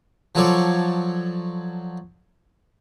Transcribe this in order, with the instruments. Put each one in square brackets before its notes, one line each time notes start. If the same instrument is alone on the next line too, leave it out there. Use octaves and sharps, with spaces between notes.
[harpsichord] F3 F#3 F4 A4 C#5 D5